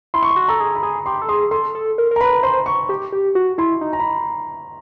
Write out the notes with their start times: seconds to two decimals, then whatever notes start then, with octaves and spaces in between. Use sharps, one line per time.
0.14 E4 C6
0.23 C#6
0.31 C6
0.36 F#4
0.48 A4 A#5
0.60 G#4
0.76 B5
0.83 G#4 A#5
1.06 G4 C6
1.22 A4
1.29 G#4 C6
1.51 A4 C6
1.75 A4
1.98 A#4
2.11 A#4
2.16 A#5
2.21 B4 B5
2.43 C5 C6
2.66 C#6
2.89 G4
3.12 G4
3.35 F#4
3.58 E4 C6
3.81 D#4
3.93 A#5
4.00 B5